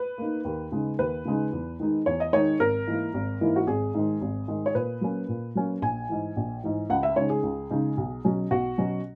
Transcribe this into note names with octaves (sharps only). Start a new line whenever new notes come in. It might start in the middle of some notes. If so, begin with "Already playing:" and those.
Already playing: B4
A#3 D#4
D#2
C#3 G#3 D#4
D#2 B4
C#3 G#3 D#4
E2
D#3 G#3 D#4
E2 C#5
D#5
D#3 G#3 D#4 C#5
G#1 A#4
G#2 E3 A#3 E4
G#1
G#2 E3 A#3 E4
F#4
G#1 G#4
G#2 D#3 G#3
G#1
G#2 D#3 G#3
C#5
A#2 B4
F#3 A#3 C#4
A#2
F#3 A#3 C#4
A#1 G#5
G#2 E3
A#1
G#2 E3
C#2 F#5
E5
C#3 G#3 D#4 C#5
G#4
C#2
C#3 G#3 D#4
B1
B2 F#3 C#4
B1 F#4
B2 F#3 C#4